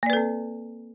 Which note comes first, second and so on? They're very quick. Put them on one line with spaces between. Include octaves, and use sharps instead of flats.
A#3 D5 B4 A4 C4